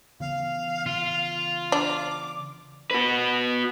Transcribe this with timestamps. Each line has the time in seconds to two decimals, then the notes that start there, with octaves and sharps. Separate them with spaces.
0.20 C#3 E3 B3 F5
0.86 F4
1.72 D4 D6
2.91 F#4 B4